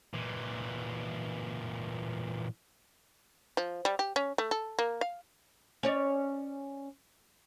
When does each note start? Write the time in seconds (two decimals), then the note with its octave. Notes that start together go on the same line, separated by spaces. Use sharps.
0.14 A#2 E3
3.57 F3
3.85 G3
3.99 G4
4.16 C#4
4.38 A3
4.51 A4
4.79 A#3
5.01 F5
5.83 C#4 C#5 D5